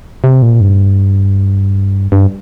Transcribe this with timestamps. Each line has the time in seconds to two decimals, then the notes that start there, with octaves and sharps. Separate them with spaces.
0.24 C3
0.42 A#2
0.61 G2
2.12 G2